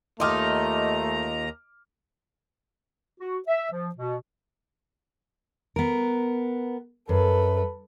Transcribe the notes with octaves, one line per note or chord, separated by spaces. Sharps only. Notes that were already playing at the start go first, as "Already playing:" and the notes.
D#2 A3 D#4 F4 D#5 A#5 D6 F6
F#4
E5
F3
B2
B3 A#4
F#2 A4 B4